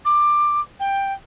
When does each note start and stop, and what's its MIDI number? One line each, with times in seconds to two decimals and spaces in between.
0.05 0.61 86
0.80 1.13 79